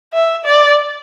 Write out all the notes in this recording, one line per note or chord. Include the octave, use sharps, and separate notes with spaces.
E5
D5